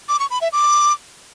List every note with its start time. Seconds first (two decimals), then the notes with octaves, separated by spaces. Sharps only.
0.09 D6
0.20 C#6
0.31 B5
0.41 E5
0.52 D6